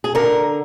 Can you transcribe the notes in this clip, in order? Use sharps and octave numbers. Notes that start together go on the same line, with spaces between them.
G#4
D3 A#4